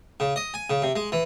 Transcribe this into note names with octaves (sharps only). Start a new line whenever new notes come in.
C#3
D#5
G#5
C#3
C3
G#3
E3